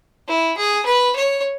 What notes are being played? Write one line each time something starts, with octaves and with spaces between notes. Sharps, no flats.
E4
G#4
B4
C#5